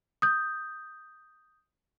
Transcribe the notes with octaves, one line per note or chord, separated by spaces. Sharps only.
D#6 G6